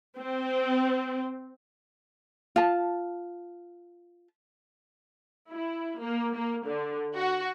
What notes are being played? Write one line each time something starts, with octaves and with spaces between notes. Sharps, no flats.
C4
F4 A5
E4
A#3
A#3
D3
F#4